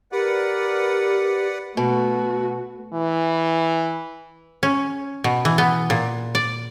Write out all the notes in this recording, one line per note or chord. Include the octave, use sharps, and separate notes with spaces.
G4 A#4 B4 D5 F#5
B2 A3 F#4
E3
C#4
B2
E3
B3
A#2
D5